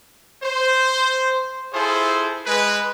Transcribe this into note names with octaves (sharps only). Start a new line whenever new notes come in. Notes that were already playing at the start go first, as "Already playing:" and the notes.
C5
E4 F4 G#4 A4 C5
G#3 B4